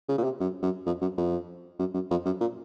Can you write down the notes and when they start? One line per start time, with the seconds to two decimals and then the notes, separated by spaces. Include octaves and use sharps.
0.09 C#3
0.18 A#2
0.24 C3
0.40 F#2
0.62 F#2
0.86 F2
1.01 F#2
1.18 F2
1.79 F#2
1.94 F#2
2.11 F2
2.26 F#2
2.41 A#2